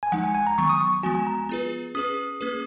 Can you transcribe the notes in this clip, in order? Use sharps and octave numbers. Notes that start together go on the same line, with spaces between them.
G#5
F3 G#3 D#4 F#5
G#5
G#5
A#5
D#3 F#3 B3 C#6
D#6
C#6
F3 G#3 B3 F#4 G#5
G#5
A#5
B3 F4 G#4 B4
C#4 G#4 B4 D#6
A#3 C#4 G#4 B4